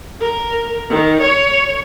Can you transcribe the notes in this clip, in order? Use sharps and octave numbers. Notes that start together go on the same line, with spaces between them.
A#4
D#3
C#5